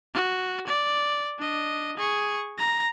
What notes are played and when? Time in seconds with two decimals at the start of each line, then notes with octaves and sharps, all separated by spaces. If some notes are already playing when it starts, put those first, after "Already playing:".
0.14 F#4
0.67 D5
1.39 D4 D#5
1.98 G#4 C#6
2.58 A#5 A#6